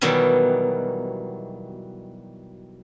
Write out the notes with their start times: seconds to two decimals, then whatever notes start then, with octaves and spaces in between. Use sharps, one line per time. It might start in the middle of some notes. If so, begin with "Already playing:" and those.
0.01 B2 D#3 E3 F#3 G3